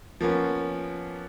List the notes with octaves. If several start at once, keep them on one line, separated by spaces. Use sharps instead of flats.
F3 A#3 B3 C#4